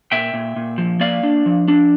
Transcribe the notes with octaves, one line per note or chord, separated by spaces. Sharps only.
A#2 E5 G5
A#2
A#2
F3
A#3 D5 F5
D4
F3
D4